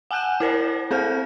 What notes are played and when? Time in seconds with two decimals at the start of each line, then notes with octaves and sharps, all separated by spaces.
0.11 F#5 G#5 A5 F#6 G6 E7
0.40 E4 A#4 C5 D5
0.91 C4 G#4 A4 C5 F6 G6